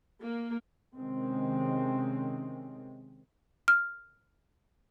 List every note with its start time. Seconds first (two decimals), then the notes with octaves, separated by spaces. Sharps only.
0.22 A#3
0.95 C3 D#3 G#3 C4 C#4
3.68 F6